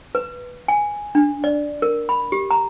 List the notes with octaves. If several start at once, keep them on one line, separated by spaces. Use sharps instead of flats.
B4
G#5
D4
D5
A#4
B5
G4
A#5